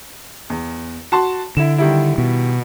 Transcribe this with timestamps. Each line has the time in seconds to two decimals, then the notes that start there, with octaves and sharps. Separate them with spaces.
0.50 E2
1.12 F#4 A5 C6
1.57 D3 E4 E7
1.78 D#3 G3 E4
2.18 B2